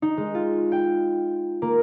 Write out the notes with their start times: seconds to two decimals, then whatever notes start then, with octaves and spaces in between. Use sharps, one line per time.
0.02 D#4
0.17 G#3
0.34 F4
0.72 G5
1.62 A#3